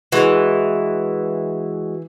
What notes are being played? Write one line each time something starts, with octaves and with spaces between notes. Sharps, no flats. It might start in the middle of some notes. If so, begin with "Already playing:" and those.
E3 G#3 F#4